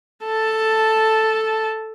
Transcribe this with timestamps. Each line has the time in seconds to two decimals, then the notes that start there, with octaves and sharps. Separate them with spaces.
0.24 A4 A5